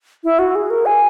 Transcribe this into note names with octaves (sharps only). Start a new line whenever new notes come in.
E4
F#4
G#4
A#4
G#5